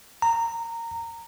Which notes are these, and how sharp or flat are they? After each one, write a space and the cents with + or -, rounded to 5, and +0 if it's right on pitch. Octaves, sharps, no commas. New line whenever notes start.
A#5 -15